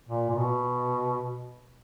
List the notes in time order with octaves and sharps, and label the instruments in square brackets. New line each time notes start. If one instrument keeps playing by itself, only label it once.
[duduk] A#2
A#2
B2